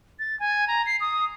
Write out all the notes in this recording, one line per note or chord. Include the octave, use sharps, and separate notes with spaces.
A6
G#5
A#5
C7
D#6